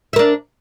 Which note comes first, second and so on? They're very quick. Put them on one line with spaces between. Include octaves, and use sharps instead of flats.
E5 A#4 D4